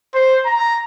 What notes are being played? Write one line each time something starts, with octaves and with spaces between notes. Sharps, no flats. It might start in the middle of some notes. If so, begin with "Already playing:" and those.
C5
A#5